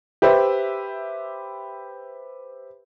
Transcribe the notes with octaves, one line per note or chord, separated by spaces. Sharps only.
G4 B4 C5 E5